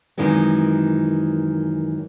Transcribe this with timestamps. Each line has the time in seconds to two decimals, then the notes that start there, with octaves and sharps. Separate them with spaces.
0.18 F#2 D#3 E3 G#3 C4